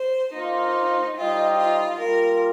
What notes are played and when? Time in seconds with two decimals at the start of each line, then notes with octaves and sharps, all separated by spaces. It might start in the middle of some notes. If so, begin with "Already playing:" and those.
Already playing: C5
0.32 A#3 D#4 F4 C5
1.15 G3 D#4 F4 C5 D#5 G5
1.58 F4
1.99 G3 A#3 F4 A#4